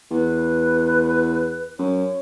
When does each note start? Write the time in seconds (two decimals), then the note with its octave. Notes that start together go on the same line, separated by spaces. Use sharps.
0.11 E2 B4
1.78 F#2 C#5